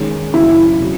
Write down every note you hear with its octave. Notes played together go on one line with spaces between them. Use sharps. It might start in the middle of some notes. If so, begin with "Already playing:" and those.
Already playing: D#3 G#3 C#4 G#4
F#2 C#3 F#3 E4
C3 F#3